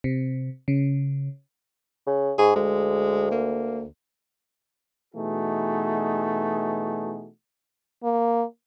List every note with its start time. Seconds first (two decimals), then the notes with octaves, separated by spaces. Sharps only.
0.04 C3
0.68 C#3
2.07 C#3
2.38 G#2 G#4
2.55 D2 G#3
3.31 A#3
5.15 B2 E3 A3 D#4 F#4 G#4
8.03 A#3